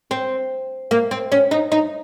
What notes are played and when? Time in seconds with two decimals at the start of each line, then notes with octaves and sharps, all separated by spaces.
0.11 C4
0.91 A#3
1.11 C4
1.32 C#4
1.51 D#4
1.72 D#4